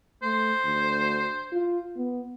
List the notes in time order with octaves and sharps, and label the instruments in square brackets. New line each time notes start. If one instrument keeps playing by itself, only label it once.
[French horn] A3 [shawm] C5
[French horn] D2
F4
B3